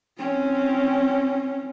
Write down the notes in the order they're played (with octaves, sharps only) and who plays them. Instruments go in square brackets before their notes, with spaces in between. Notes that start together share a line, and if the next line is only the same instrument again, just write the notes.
[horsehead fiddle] C4 C#4